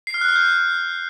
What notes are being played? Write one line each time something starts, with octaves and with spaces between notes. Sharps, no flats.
C7
F6
F#6
F6
G6